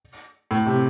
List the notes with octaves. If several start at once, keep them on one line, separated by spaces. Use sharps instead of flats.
A2
C3